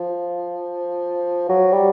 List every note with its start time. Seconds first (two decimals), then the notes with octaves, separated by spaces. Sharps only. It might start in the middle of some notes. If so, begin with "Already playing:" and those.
Already playing: F3
1.49 F#3
1.72 G3